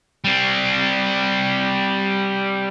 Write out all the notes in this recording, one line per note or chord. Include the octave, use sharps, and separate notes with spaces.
G3 C4